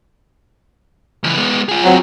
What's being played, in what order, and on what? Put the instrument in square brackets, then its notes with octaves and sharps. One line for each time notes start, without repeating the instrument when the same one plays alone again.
[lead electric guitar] C#2 E3
G#3 B3
F4 G#4
[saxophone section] F#3 C4